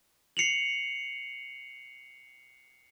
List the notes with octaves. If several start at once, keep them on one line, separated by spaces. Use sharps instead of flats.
C7 C#7 F7 F#7